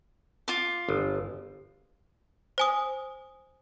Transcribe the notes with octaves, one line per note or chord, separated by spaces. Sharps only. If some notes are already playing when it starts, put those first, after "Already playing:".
F4 D6
G1
C5 G#5 D#6